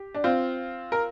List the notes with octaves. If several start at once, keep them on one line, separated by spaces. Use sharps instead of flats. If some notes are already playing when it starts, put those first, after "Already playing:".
Already playing: G4
D4
C4 F4
A#4